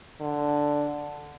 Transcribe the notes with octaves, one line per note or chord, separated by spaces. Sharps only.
D3